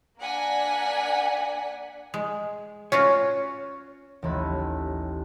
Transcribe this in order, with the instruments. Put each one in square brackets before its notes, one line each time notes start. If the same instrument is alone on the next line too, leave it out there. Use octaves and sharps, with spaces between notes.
[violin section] A#3 D4 F#5 G#5 B6
[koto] G#3
[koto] C#4 F4 F#4 [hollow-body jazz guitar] C#5
[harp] A1 D#2 B5